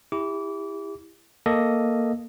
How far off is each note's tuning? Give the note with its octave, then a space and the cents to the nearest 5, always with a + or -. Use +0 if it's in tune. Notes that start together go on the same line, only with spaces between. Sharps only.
E4 +0 G4 +35 D6 -30
A#3 +0 A4 +0 D#5 +0